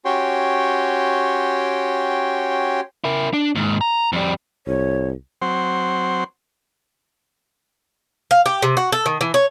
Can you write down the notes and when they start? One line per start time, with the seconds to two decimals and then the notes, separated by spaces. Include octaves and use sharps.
0.05 C#4 F#4 G4 C#5 G5 C6
3.04 E4 A#4
3.33 D4
3.55 D#2 G#2
3.81 A#5
4.13 F2 G3
4.67 C2 C#5
5.42 F#3 C4 C5
8.31 F5
8.46 G4
8.62 C3
8.77 F#4
8.92 A4
9.06 D#3
9.21 E3
9.34 C#5